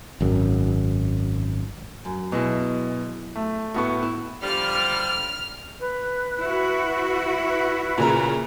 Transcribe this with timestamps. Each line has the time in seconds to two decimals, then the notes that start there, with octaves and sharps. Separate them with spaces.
0.21 G#1 F#2
2.05 F#2
2.32 B2 F#3 G#3 E4
3.35 A3
3.74 A2 B3 F#4 A4 C#6
4.03 E4
4.43 D3 F3 G3 F6
5.80 B4
6.39 E4 F#4
7.48 B4
7.98 A#2 C#3 A#5